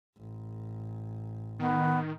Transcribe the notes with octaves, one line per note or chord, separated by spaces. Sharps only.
A1
D#3 B3